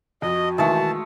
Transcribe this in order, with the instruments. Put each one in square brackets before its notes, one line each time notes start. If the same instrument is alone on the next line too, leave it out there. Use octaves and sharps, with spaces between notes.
[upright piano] F2 [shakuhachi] F#4 [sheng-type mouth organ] D#5
[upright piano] B1 D#3 E3 [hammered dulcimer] G#3 A3 [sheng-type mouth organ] A5